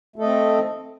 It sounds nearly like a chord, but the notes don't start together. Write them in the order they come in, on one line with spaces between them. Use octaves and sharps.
A3 A4 D#5 C4